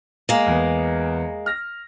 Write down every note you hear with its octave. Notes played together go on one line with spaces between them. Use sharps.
G#3 A#3 D#5
E2 B3
F6 A#6